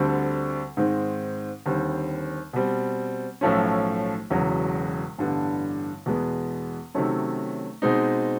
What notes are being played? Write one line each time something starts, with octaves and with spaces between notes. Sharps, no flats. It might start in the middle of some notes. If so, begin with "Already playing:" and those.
Already playing: D2 D3 G3 C4
G#2 D#3 G#3 C4
D#2 D3 G3 C4
B2 G3 C4
B1 A2 F3 A3 C#4
E1 E2 C#3 F#3
A1 G2 D3 G3 B3
E2 B2 G#3 B3
C3 D#3 F#3 A3 C#4
B2 G#3 C4 D#4